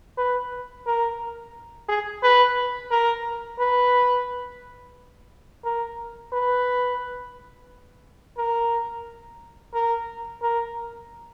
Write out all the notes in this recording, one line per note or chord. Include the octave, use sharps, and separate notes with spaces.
B4
A#4
G#4
B4
A#4
B4
A#4
B4
A#4
A#4
A#4